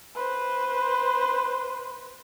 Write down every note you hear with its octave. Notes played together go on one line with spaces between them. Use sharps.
B4 C5